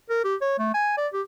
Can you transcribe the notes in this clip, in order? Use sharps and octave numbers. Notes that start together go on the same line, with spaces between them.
A#4
G4
C#5
A3
G#5
D5
G4